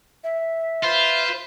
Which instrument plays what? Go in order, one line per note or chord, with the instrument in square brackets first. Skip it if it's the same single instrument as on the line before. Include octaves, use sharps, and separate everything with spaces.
[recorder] E5
[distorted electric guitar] F4 [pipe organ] B4 C5